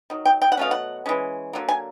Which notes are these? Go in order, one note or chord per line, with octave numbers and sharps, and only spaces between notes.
D#3 F#3
G5
G5
F#5
B2 F#3 A3 C#4 F5
F#5
E3 G#3 C#4
D3 F#3 A#3
G#5